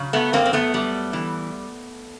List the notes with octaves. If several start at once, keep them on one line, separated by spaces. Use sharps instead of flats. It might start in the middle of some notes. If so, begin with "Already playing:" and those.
Already playing: C#3 F#3
A3 B3
F#2 A#3 C4
C4
A3 B3
G3
E3